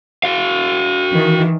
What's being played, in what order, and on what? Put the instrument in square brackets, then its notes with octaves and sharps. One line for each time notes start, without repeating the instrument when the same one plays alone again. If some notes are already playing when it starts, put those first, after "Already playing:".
[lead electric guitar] F#4 F5
[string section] D#3 E3